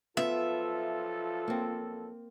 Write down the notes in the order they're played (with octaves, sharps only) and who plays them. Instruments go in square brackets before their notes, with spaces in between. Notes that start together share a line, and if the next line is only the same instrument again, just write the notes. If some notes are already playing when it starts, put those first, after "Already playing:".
[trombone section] B1 F3 A4 [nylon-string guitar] B3 [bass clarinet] F4 [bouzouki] E5
[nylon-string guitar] A#3 C4